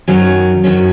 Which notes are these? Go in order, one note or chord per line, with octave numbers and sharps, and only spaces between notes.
F#2 D#3 F#3 C#4
F#2 D#3 F#3 C#4